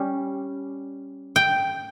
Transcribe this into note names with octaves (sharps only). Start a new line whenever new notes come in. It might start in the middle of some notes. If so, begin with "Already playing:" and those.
Already playing: G3 C#4
G5